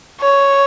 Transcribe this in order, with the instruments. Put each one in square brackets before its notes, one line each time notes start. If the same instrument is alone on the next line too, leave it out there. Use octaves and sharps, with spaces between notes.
[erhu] C#5